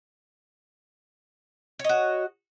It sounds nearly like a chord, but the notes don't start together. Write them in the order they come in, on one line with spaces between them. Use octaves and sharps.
C#5 D#5 F#4